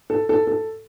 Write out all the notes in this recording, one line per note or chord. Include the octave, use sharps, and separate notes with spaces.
A4
A4
A4